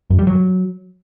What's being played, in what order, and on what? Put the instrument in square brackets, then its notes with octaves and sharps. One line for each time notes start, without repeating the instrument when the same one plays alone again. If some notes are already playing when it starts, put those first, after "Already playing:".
[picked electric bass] F#2
G3
F#3